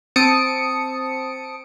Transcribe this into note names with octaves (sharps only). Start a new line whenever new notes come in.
C4 A5 D#6 C#7 D7